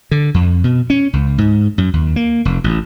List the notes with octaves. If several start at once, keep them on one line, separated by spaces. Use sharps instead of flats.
D3
F2
B2
C#4
C#2
G#2
F#2
D#2
A#3
F1
A1